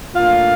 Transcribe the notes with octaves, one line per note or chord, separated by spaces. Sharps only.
A#2 A3 D4 F4 F5